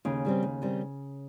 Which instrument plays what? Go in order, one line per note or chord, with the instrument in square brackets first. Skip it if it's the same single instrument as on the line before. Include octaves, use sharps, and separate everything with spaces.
[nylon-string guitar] D#2 [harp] C#3
[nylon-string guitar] D#3 G3 C4
D#2
D#3 G3 C4